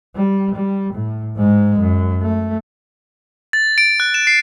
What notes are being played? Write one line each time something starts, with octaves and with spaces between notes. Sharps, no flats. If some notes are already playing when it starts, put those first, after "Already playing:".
G3
G3
A2
G#2 G#3
F#2
A3
A6
D7
F#6
E7
C7